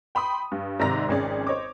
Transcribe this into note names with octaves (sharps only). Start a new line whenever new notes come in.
G5 B5 C6 D#6
G2
G#2 C3 D#3 D5 A#5 A#6
G#1 F2 C#4 G#4 D5
C5 C#5 D#5 D6